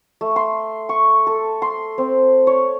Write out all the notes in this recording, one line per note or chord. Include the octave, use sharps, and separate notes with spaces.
A3
C6
C#6
A4
C6
C4
C#5